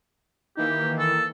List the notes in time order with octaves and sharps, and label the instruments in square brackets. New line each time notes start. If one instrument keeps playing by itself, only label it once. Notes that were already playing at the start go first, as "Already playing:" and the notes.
[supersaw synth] D#3 E3 A#3 [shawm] G4
[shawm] A4